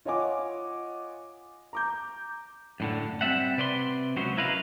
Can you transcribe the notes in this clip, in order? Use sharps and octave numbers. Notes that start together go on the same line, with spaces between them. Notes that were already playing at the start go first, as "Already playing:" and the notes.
F4 C#5 D#5 F#5 G#5 D6
A#5 D6 G6
F#2 A2 D3
G3 C4 E5 F#5
C3 B4 D5 E5 C6
C#2 F#3 B3 C#4 C5
E4 A#4 B4 D#5 F5